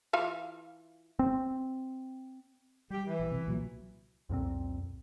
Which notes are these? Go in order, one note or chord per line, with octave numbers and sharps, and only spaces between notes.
E3 F4 F5
C4
G3 G4
E3
A#1
C3
C2 A#2 F#3
C2 F2 A#2 C4